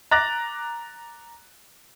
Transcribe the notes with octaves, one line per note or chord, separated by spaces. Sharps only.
A#5 D6 F#6 A6 A#6